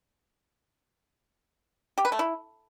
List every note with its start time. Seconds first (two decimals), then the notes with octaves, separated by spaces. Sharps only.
1.98 G4
2.05 B4
2.12 A3
2.19 E4